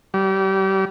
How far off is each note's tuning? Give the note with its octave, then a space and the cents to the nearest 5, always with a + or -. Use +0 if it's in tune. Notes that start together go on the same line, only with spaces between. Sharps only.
G3 -30